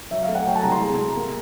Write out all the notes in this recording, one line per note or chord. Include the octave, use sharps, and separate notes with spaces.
F#3 E5
F5
A3
F#5
F#3 G5
A5
C2 A#5
C6
G#3 A#5
G#3
A#3